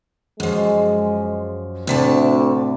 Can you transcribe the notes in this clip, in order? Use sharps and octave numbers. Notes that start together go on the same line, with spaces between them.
F#2 F3 G#3
D2 A2 C3 A5